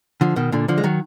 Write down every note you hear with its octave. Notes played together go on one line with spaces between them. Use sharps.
D3 F3
B2 D#3
A#2 D3
D3 F3
G#3
D#3 F#3